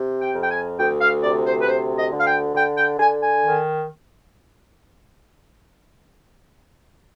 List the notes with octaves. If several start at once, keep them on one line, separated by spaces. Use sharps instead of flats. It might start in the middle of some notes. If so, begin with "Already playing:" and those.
Already playing: C3
G5
F2
G5
G#5
D2 G5
F5
C3 D5
C5
B4
D2 C5
D#5
D3
F5
G5
D3 G5
G5
D3 G#5
G#5
D#3